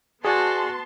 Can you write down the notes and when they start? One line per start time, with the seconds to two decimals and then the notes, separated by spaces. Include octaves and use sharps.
0.25 B3 F#4 G#4 D5 G#5 A5 C6